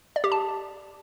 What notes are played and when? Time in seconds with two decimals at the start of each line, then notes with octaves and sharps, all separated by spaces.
0.16 D5
0.24 G4
0.32 A5